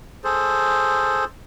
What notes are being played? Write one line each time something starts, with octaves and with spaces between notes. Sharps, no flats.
G#4 A4 C5